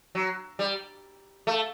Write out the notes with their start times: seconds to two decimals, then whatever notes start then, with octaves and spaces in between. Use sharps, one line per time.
0.15 F#3
0.59 G3
1.47 A3